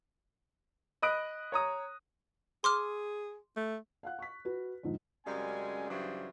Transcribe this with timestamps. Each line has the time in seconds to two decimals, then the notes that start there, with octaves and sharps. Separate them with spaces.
1.02 D#5 B5 D#6 F#6 D7
1.52 C#5 A#5 D#6
2.64 G#4 C6 D6 F6
3.57 A3
4.03 F5 F#5 F#6
4.19 C#6 B6
4.45 F#4 B4
4.83 F2 G#2 D3
5.26 F#2 C#3 G3 G#3 C4 G#5
5.90 G2 C#3 E3 F#3 C5 D5